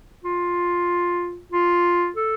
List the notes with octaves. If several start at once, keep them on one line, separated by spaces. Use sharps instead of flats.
F4
F4
A4